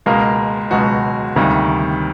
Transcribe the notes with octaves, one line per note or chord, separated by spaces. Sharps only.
C#2 B2 G#3 A#3 A#4
C#2 B2 F#3 G#3 F#4
D2 C3 D#3 G3 A#3